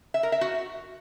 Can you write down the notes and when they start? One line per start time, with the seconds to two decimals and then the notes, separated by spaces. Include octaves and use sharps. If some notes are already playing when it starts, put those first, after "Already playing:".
0.14 E5
0.23 A#4
0.32 E5
0.41 F#4